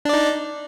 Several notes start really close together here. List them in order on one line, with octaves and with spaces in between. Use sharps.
D4 D5 D#4